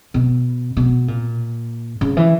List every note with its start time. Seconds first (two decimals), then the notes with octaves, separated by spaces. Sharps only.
0.14 B2
0.77 B2
1.08 A#2
2.01 C#3
2.17 E3